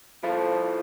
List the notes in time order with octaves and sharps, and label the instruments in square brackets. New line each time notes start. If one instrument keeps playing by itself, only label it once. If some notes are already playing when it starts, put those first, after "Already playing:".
[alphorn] F3 [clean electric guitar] E4 F4 A4